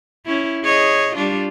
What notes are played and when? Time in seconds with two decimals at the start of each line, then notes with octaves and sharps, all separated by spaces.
0.26 C#4 E4
0.65 G#4 C#5 D#5
1.16 G3 D4 F4